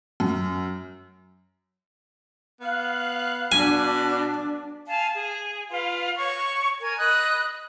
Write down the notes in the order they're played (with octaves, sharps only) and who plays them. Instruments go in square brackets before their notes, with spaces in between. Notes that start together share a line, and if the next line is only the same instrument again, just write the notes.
[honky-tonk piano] F#2
[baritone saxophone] B3 [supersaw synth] F5 F#6
[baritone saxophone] B2 [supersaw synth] D4 [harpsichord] G#5
[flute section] F5 G#5 A5
G#4
F4 B4 F5
C#5 C#6
A#4 G#5 G#6
D#5 B5 D#6 F#6